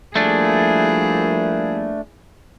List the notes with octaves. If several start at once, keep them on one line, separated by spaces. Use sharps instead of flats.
F3 G3 A3 A#3 D4 E4 G#4